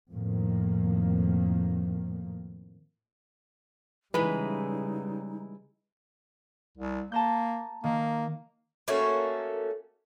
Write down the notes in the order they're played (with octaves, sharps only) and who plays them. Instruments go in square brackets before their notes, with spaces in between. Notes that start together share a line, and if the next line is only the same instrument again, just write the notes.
[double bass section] F2 A2 D#3 A#3
[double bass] C#3 G3 [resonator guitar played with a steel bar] E3 G#3 [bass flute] D#4 [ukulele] B4
[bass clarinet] C2
[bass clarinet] A#3 [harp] A5 A#5 G6
[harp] D#3 [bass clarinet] A#3
[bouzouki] A3 A#3 C#4 F#4